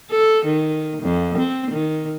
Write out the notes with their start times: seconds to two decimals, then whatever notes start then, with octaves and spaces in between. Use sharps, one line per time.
0.10 A4
0.45 D#3
1.02 F2
1.38 C4
1.71 D#3